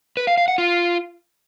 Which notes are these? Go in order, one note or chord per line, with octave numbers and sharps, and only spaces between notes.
B4
F5
F5
F#5
F4